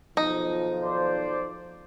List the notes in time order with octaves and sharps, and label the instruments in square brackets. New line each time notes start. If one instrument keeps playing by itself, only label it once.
[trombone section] B1 D#3 F3 [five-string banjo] D#4
[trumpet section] C5 D5